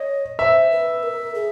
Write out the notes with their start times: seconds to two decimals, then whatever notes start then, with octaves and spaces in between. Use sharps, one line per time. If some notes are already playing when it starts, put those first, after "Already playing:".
Already playing: C#5 D#5
0.39 C5 E5
0.71 B4
1.03 A#4
1.35 G#4